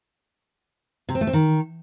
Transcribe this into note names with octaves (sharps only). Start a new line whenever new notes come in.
C3
C4
A3
C4
D#3